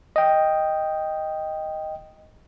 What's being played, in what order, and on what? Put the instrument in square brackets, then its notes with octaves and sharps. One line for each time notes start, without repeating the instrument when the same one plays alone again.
[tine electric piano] D#5 G5